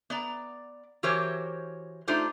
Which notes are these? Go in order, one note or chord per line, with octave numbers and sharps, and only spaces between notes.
B3 D5 A#5
E3 F#4 G4 A#4 C5 C#5
A3 D4 D#4 F4 G4 C5